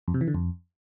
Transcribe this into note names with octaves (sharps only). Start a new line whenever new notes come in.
F2
C3
E3
D3
F2